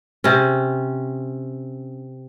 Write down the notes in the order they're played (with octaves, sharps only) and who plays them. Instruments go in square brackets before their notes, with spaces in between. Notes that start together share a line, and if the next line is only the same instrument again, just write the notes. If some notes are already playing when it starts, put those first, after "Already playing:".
[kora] C3 C#4